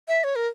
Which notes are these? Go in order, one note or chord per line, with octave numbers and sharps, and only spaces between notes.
E5
C#5
A#4